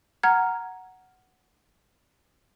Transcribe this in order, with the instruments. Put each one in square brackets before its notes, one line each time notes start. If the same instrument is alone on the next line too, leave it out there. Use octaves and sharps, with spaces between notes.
[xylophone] F#5 A#5 F6 G#6